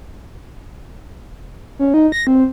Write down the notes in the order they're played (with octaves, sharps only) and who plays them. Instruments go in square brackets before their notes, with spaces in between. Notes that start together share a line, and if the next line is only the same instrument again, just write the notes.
[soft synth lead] C#4
D#4
A#6
C4